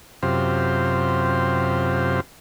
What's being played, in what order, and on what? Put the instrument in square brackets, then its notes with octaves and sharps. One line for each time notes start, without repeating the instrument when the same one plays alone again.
[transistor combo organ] F#2 C3 F4 G4 C5